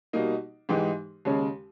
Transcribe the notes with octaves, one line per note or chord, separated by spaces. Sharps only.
B2 G3 A#3 D#4
G#2 E3 G#3 D#4 G4
D#2 C#3 G#3 C#4